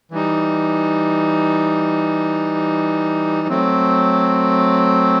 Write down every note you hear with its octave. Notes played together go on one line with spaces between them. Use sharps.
E3 G3 D#4
F#3 A3 C4